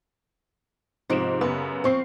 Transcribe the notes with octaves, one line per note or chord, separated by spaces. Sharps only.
G#2 C3 F3 D7 E7
F#2 C#3 B3 B4
F3 C4 C5 C#6 C7